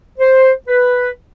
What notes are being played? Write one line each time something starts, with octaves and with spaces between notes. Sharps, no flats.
C5
B4